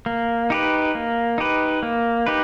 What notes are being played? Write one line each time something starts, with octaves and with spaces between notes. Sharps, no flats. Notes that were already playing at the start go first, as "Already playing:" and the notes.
A#3
D#4 G4 B4
A#3
D#4 G4 B4
A#3
D#4 G4 B4